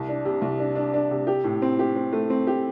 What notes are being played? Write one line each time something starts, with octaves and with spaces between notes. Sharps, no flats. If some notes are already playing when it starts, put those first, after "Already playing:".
Already playing: C2
D4
C3
C2
D4
D4
D4
C3
G4
A2
C4
G4
C4
A3
C4
G4